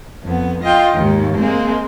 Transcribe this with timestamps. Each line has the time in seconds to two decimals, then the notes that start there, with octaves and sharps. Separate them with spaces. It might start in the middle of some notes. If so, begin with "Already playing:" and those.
0.23 F2 B3
0.63 F4 D#5 G5
0.94 D#2 G#2
1.38 G#3 A#3 C4